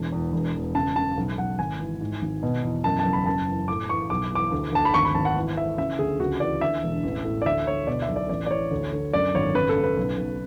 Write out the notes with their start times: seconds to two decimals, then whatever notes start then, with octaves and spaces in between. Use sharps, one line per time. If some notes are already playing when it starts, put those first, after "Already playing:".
Already playing: E1 E3 A5
0.12 E2
0.33 E1
0.54 E2
0.75 C#3 A5
0.96 C#3 A5
1.17 B1
1.38 B1 F#5
1.59 G#1 G#5
1.79 E3
2.01 G#2
2.22 G#1
2.43 B2
2.63 E2
2.84 F#2 A5
2.99 A5
3.05 F#1
3.13 B5
3.26 F#2 A5
3.47 E3
3.68 A2 D6
3.89 E3 C#6
4.10 B1 D6
4.32 E3 D6
4.52 D2
4.73 D2 A5
4.85 B5
4.94 G#1 C#6
5.05 B5
5.14 G#1 A5
5.25 F#5
5.36 E3
5.57 E3 E5
5.78 C#3 E5
5.99 D2 G#4
6.20 C#2 F#4
6.40 E3 D5
6.61 D3 E5
6.83 E1
7.03 A1
7.24 A2
7.42 D5
7.46 D2 E5
7.67 D3 C#5
7.87 B2 D5
8.02 E5
8.08 B1
8.16 D5
8.29 A1 D5
8.46 D5
8.51 E3 C#5
8.71 D2
8.93 D3
9.13 F#2 D5
9.34 G#1 C#5
9.55 C#3 B4
9.69 A4
9.76 C#3
9.83 B4
9.97 B1
10.17 B1